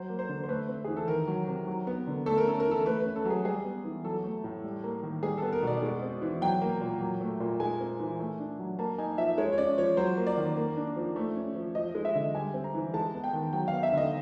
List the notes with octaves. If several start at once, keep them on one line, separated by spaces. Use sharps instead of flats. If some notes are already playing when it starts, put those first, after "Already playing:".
Already playing: F#3 C5
A#3
C5
D3
C5
A3 B4
C4
E3 G#4
A4
D#3 A#4
F#3
C3
F#3
B3
D3
A3 A4
A#4
C#4 A4
A#4
E3
A4
A3 B4
B4
C#4
A4
F#3
G#4
G3 G#4
B3
E3
F#3 A4
A3
A2
G3
A#3
D#3
G3 G#4
B3 A4
A#4
B2 D5
G#3
C4
E3
F#3 G5
A#3
A#2
F#3
A3
A#2
G#3 G#5
C4
E3
A3
D4
F#3
A#3 A5
D#4 G#5
F3 E5
G#3 C#5
C#5
C#4 D5
F3 C#5
F#3 C5
A#3
D5
D#3
A#3
D4
F3
A3
C#4
F3
F3 D#5
G#3
E5
D3
G3 G#5
C4
A#5
E3
G#3 A5
B3
G5
D#3
F#3 G5
F5
B3
E5
D3 D#5